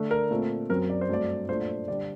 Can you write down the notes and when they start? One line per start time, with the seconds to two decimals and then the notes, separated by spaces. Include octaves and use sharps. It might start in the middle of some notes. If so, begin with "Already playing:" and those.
Already playing: D3 A3 D4
0.11 A#4
0.31 A#2 A3 C4
0.69 F#2 F#3 C4 A#4
0.89 D5
1.01 C5
1.09 G2 F#3 A3 C4 D5
1.49 A#2 A3 D4 C5
1.88 D3 G3 D4 D5